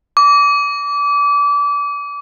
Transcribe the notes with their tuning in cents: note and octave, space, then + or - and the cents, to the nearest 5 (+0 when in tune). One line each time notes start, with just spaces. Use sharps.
D6 -30